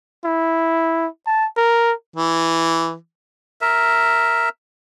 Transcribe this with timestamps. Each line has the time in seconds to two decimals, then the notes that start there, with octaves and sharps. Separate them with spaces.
0.25 E4
1.27 A5
1.57 A#4
2.16 E3
3.61 A#4 E5